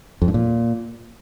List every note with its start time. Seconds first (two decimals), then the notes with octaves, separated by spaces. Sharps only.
0.22 F2
0.28 G2
0.34 A#2